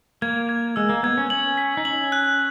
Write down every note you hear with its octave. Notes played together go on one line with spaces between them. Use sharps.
A#3 G#6
G#6
G#3 E6
A#3
B3 G#6
C#4
C#4 F#7
B6
D#4
C#4 F#7
F#6